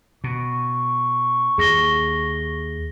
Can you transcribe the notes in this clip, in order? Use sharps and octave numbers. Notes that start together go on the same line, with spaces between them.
B2 C#6
D#2 G#4 A#6 G7